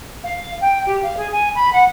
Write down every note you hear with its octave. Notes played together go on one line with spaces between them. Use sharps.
F5
G5
G4
F5
G#4
G#5
B5
F#5